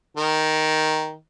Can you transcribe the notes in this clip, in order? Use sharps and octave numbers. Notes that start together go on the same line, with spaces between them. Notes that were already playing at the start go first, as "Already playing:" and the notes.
D#3